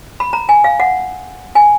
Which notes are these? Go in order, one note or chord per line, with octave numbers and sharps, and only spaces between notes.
B5
A#5
G#5
F5
F#5
G#5